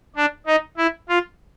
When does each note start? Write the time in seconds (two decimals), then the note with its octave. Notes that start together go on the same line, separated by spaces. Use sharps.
0.16 D4
0.47 D#4
0.77 E4
1.09 F4